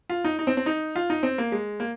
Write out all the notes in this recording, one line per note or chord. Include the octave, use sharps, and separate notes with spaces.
F4
D#4
D#4
C4
C4
D#4
F4
D#4
C4
A#3
G#3
A#3